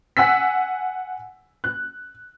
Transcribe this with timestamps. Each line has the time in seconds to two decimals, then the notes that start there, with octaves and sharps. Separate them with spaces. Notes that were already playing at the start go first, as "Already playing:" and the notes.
0.17 F#5 G#5 E6 B6
1.64 F#6